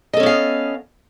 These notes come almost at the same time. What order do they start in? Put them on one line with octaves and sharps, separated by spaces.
D#5 A4 C#4 B3 F5